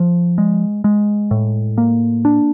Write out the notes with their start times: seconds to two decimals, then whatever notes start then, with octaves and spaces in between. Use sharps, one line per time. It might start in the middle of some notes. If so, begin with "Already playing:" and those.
Already playing: F3
0.38 G#3
0.84 G#3
1.31 A2
1.78 A#3
2.25 D4